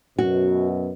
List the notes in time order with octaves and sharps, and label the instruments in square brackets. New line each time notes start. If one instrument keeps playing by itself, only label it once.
[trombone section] F#2 B2 [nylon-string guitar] F#4